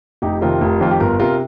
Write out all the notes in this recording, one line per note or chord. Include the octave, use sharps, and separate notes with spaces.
F1 D#4 G4
F2 C3 D#3 F4 A#4
F1
F2 D#3 F4
G4
G1 F4 A#4
C3 F4 A#4